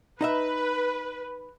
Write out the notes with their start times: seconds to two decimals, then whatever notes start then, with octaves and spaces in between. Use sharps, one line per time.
0.21 D#4 B4 D#5 E5